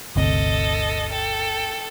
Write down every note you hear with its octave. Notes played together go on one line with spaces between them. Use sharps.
G1 D2 C3 A4 D#5
A4 G5